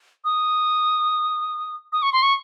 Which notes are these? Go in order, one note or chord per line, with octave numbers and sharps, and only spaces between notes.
D#6
D#6
C#6
C6
C#6